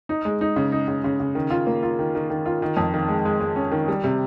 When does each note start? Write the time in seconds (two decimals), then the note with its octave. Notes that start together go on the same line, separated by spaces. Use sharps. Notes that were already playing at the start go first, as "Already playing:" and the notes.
0.09 D#4
0.25 G#3
0.41 D#4
0.56 C#3
0.72 D#4
0.88 C#3
1.04 C#3
1.20 C#3
1.35 D#3
1.50 F4
1.67 A#3
1.83 F4
1.99 D#3
2.15 D#3
2.30 D#3
2.46 F4
2.62 D#3
2.77 F2
2.94 D#3
3.08 G#3
3.25 G#3
3.40 G#3
3.56 C#4
3.72 D#3
3.88 G3
4.04 C3